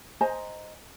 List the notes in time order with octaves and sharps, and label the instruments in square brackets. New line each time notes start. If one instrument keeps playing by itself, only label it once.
[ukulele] C5 D#5 G#5 A#5